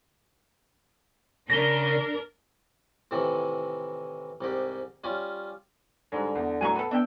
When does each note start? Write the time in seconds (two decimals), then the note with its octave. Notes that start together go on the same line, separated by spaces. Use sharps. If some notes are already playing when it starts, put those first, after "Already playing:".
1.50 C#3 D4 A#4 A#6 G7
3.11 A2 C3 D#3 E3
4.41 C2 G#2 G4
5.04 G3 C#4 F4
6.12 G#2 D3 G3 G#3
6.35 E2
6.61 A2 F#3 G#5 A#5 C#6
6.75 B3 A4 B5
6.91 B3 D4 E5 G5